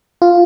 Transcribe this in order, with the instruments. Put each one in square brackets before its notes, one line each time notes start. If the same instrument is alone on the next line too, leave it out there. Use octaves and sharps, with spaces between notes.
[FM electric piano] F4